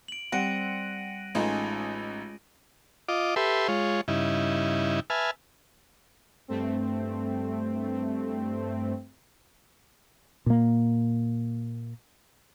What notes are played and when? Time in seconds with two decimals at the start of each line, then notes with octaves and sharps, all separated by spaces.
0.08 D7 F#7
0.32 G3 C4 F#5 A#6 D7 D#7
1.35 A1 G#3 C#4 D#4 F4 A4 G#5 D#6
3.09 F4 D#5 D6
3.36 G4 A4 B4 E5 C6
3.68 G#3 F4 C#5
4.08 G2 C#3 D#4 E4
5.10 B4 E5 G#5 A5 F6
6.48 G2 A3 C4
10.46 A#2 A#3